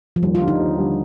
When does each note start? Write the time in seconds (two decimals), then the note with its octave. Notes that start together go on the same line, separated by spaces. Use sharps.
0.16 F3
0.23 D#2 G3
0.35 F4
0.41 D3 G3
0.48 D#4
0.59 D#2
0.77 D3 G3